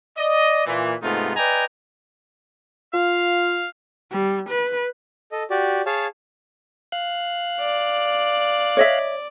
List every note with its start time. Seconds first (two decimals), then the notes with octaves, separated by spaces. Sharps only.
0.18 D5 D#5
0.66 A#2 E3
1.02 G#2 C3 A3 B3 D#4 F4
1.36 B4 D5 D#5 G5 G#5 A#5
2.94 F4 F5
4.11 G3
4.50 B4
5.32 A4 D#5
5.50 F#4 G4 D5
5.86 G#4 C#5 F5 A5
6.92 F5 F#6
7.61 D5
8.77 C#5 D#5 E5